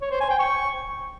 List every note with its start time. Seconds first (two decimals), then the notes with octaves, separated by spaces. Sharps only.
0.02 C#5
0.11 C5
0.20 G#5
0.30 G5
0.39 C#6